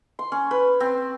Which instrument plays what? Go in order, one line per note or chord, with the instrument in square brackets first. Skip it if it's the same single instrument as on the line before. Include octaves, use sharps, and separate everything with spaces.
[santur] C6
C#4
B4
C4